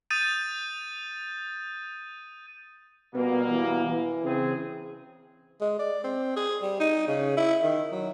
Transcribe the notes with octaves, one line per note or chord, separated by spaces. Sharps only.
D#6 G6 A6 D#7
B2 G3 A#3 B3
E3
E3
C#3 C4 G#4
G#3
D5
C4
G#4
G3
D#4
C#3
E4
D#3
F#3